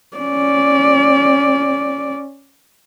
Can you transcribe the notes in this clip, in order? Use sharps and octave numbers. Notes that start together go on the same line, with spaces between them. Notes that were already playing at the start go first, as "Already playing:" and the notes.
C#4 D5